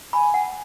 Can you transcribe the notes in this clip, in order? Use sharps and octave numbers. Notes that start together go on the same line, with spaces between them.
G#5 B5
F#5